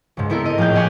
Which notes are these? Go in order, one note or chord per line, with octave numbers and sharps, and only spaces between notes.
C#2 G#2
B3 C4 E4 A4 A#4
A#4 D#5 D#6
A2 F3 A#3 G#4 F5 G6
G4 D5 D#5 F#5 G#5 C#6